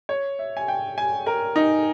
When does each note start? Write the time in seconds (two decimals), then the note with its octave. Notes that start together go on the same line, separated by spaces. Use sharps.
0.09 C#5
0.39 E5
0.57 G#5
0.68 G5
0.98 G#5
1.26 A#4
1.56 D#4